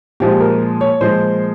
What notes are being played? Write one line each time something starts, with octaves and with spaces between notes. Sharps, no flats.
A#2 F3 G#3 G4
A#4
C#5
A#2 F3 G#3 C5